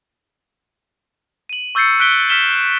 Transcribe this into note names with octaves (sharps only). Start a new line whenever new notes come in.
D#7 F#7
C#6 E6 G6 A6 C7 C#7
F#6 B6 D7 G7
F6 B6 E7 G7